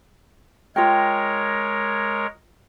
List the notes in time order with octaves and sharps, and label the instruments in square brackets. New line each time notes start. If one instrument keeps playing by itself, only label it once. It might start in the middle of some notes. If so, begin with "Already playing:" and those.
[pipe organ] G#3 A#4 C#5 [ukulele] F4 G5